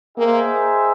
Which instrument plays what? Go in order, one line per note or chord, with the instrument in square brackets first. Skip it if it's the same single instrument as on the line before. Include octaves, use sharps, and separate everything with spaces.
[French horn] A#3 [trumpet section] D#4 G#4 C5 E5 G5